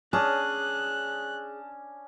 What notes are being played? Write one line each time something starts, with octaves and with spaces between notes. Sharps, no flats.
C#4 D4 G#4 A5 D#6 F#6